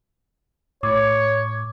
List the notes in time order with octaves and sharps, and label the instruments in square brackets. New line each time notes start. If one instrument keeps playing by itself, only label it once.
[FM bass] A2 [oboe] C#5 [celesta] D6